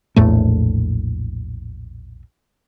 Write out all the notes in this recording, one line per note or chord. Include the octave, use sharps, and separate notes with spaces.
A#1 E2 A2 A3